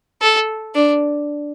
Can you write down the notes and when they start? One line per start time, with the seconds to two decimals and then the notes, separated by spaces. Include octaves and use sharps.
0.22 A4
0.75 D4